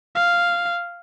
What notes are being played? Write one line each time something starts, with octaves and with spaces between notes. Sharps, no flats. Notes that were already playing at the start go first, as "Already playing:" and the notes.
F5